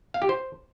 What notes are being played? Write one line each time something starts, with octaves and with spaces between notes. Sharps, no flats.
F5
G4
C5